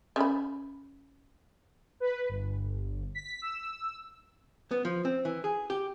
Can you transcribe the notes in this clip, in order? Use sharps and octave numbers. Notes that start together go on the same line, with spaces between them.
C#3 B5
B4
G1
B6
E6
B3
F3
C4
E3
G#4
G4